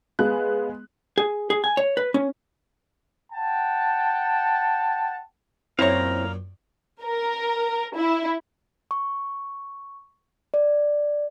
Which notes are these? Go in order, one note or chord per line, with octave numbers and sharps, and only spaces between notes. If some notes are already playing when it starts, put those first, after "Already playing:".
G#3 B3 G#4 B4 F5 F#6
G#4
G#4
G#5
C#5
B4
C#4
F#5 G5 A5
F#2 A#2 C4 E4 C#5 F5 A#5
A#4
E4
C#6
D5